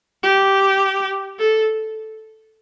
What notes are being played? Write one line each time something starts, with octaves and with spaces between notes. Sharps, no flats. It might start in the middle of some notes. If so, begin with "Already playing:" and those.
G4
A4